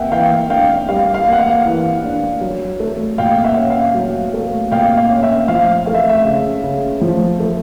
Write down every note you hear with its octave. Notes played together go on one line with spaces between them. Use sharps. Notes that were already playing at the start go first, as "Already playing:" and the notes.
Already playing: A#3 E5 F#5 G5
E3 F5 G5
D4 F5 G5
G3 F5
F5
A#3
F#5
F5
E3
D4
F#3
A3
A#2 F5 G5
E5 F#5
C#4
F5
F#3
A3
A#2 F5 G5
F5
C#4
E5
F3 F5
A3 F5
E5
E5
C#3
C#3
F3
A3